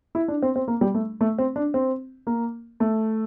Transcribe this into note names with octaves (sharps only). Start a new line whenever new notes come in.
E4
D4
C4
C4
A#3
G3
A3
A3
C4
D4
C4
A#3
A3